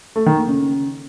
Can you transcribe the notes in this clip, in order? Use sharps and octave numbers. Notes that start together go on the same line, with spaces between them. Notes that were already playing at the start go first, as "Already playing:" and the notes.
A3
D#3
A#3
C#3